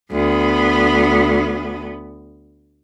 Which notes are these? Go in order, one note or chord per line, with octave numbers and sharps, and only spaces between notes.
D2 B3